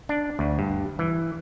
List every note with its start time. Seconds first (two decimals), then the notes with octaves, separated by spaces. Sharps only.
0.09 D4
0.39 D2
0.59 G2
0.99 E3